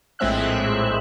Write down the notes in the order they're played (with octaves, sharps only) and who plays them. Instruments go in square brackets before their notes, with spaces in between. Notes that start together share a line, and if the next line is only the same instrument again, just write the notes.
[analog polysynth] A#1 A2 G#3 C4 E5 F#6